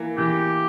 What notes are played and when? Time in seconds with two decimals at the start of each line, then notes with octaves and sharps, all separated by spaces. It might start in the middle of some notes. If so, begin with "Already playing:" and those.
Already playing: E3 A#3
0.18 E3 G4